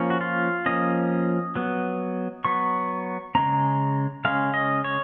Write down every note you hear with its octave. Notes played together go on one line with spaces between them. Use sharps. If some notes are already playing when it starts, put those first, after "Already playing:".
Already playing: F3 A#3 C#4
F#4
F4
F3 A#3 C#4 D#5
F#3 B3
F#3 B3 C#6
C#3 G#3 C#4 A#5
C#3 G#3 C#4 F5
D#5
C#5